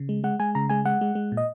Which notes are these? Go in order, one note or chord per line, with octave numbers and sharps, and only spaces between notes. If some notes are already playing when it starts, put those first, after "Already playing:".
Already playing: C#3
G#3
G#3 F#5
G#3 G#5
C#3 A#5
G#3 G#5
G#3 F#5
G#3
G#3
A#2
D#5